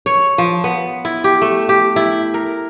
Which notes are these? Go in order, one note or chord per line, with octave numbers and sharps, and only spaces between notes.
C#5
F3
B3
E4
G4
A3
G4
E4
A#4